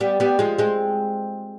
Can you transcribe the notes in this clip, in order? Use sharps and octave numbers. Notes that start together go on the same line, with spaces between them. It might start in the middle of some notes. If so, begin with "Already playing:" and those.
G3 B3
G3 B3
F3 G#3
G#3 C4